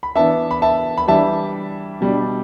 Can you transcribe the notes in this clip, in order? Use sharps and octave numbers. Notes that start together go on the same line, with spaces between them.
B5
E3 B3 D4 E5 A5
B5
E5 A5
B5
E3 G3 D4 E5 A5
B2 G3 D4